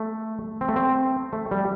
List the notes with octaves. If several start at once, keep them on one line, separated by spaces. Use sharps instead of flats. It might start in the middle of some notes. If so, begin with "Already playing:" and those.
Already playing: A3
C4
A3
C4
A3
G3